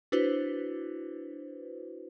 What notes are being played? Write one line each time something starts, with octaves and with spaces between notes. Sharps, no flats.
D4 E4 F#4 B4 C5